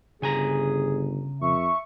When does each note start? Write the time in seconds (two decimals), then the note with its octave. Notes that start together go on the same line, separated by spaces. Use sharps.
0.22 G1 C#3 G#4 G#5 A#5
1.41 F2 E5 C#6